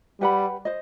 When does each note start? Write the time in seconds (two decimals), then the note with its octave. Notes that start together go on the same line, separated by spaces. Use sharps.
0.20 G3 G4 B4 F#5 B5
0.65 C5 D#5